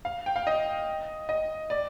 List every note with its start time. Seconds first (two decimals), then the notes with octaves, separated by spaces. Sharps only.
0.05 F5
0.26 G5
0.36 F5
0.47 D#5
1.29 D#5
1.70 D5